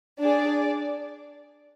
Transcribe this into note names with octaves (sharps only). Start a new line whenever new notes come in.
D4 G#4 D5